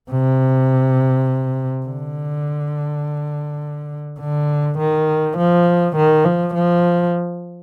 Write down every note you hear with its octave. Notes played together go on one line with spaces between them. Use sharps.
C3
D3
D3
D#3
F3
D#3
F3
F3